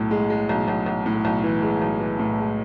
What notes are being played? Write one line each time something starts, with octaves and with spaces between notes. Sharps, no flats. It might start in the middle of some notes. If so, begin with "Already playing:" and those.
Already playing: B1 A2
G#3
G#3
B1
B1
B1
A2
B1
E3
G#3
B1
E3
A2
G#3